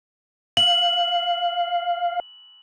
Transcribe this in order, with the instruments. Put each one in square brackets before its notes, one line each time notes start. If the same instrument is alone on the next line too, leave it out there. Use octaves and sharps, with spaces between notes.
[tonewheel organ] F5 [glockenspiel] F#7